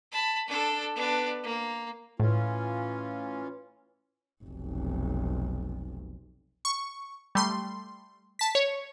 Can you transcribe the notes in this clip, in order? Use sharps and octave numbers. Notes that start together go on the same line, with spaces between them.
A5 B5
D4 A4
B3 D4
A#3
A2 E3 C#4 F4
F1 B1
C#6
G3 A3 C6
A5 B6
C#5